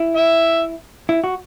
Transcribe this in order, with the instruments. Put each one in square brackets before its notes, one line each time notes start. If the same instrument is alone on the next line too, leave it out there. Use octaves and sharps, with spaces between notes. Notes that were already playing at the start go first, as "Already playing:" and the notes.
Already playing: [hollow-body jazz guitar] E4
[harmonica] E5
[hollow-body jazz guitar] E4
F#4